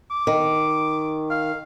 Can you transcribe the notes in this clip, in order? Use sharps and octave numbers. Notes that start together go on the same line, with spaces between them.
D6
D#3
F5